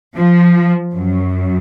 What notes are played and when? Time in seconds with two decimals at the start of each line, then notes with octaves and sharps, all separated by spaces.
0.16 F3
0.94 F#2